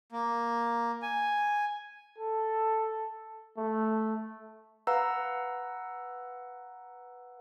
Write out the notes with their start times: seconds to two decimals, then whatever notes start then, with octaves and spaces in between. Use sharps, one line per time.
0.12 A#3
1.02 G#5
2.19 A4
3.58 A3
4.87 B4 F5 F#5 A#5 E6